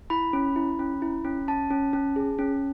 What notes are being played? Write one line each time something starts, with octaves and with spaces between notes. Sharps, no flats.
E4 B5
C#4
E4
C#4
E4
C#4
C#4 A5
C#4
C#4
G#4
C#4